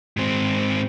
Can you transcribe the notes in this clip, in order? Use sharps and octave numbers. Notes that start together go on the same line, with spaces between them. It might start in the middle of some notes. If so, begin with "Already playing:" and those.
G#2 C4